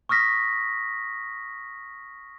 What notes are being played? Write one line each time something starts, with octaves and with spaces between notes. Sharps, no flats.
C#6 D#6 F6 A#6 B6